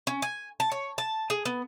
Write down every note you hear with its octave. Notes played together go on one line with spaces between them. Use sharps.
C#4
G#5
A5
C#5
A5
G#4
B3